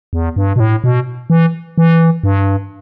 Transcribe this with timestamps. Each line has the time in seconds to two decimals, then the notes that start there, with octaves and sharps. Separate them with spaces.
0.13 E2
0.36 G2
0.56 B2
0.60 A2
0.84 B2
1.30 E3
1.78 E3
2.24 G2